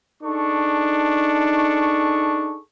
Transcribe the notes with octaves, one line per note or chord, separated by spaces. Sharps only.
D4 D#4 G#4 A4 C#6